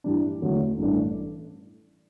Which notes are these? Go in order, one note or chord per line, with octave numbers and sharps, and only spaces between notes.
G2 E3 G3 D4
E2 D3 F#3 A3 C#4
A1 G2 E3 A3 D4